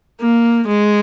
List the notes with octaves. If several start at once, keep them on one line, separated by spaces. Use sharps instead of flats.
A#3
G#3